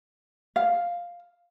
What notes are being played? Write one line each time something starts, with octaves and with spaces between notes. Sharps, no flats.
F5